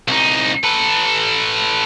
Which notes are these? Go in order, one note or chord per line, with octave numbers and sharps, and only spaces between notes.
C2 D#4
A4 B4